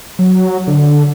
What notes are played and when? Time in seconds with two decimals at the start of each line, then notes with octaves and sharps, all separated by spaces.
0.19 F#3
0.67 D3